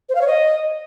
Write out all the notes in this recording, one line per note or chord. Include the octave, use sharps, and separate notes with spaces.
C5
F5
C#5
D#5